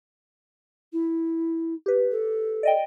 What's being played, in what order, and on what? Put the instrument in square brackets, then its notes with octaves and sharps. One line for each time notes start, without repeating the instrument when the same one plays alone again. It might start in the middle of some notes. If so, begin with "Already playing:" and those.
[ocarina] E4
[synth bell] G4 B4
[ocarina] A4
[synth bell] D5 D#5 G5